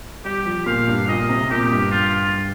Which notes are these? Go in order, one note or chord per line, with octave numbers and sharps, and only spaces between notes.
G3 G4
F3
A#2 F5
G2
A#2 D#5
C3
A#2 G4
G2
F4